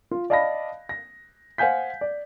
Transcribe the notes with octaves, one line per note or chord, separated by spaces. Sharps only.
F4
D5 D#5 F5 A5 B5 A#6
A#6
C5 F5 F#5 G#5 G6 B6
D5